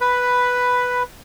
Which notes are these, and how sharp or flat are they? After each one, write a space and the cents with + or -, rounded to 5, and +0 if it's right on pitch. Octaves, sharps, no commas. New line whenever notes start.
B4 +0 B5 +5